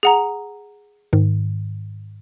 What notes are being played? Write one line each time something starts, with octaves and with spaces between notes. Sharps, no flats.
G#4 F#5 A#5
G#2 D#3